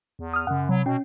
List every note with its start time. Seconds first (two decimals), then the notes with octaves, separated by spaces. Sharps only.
0.19 E2
0.34 D#6 F6
0.47 F#2 C#3 F#5
0.69 C3 F#3
0.86 B2 C#4 G5